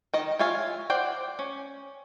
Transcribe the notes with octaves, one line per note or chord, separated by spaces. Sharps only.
D#3 D#5
F4 C#5 E5 F5 G#5
C5 D5 F#5 G5
C#4